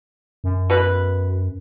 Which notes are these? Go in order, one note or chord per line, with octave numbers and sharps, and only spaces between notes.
F#2
B2 B4